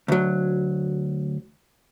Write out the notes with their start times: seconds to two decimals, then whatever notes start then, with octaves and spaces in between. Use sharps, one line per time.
0.08 D2 F#3